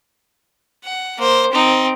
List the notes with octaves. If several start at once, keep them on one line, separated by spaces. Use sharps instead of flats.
F#5
A#3 C5
C4 D#4